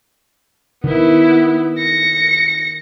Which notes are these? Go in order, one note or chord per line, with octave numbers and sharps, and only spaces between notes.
D#3 B3 E4
A#6 C#7